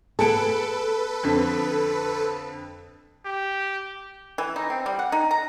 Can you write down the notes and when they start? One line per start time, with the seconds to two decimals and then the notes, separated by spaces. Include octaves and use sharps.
0.19 B3 G#4 A4 B4 A5 C#7 D7
1.23 F2 D3 B6
3.26 G4
4.38 E3
4.56 D#4
4.70 C4
4.86 G3
4.99 F#5
5.12 D#4
5.31 A#5